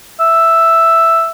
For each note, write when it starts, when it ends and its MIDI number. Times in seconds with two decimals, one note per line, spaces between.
0.20 1.31 76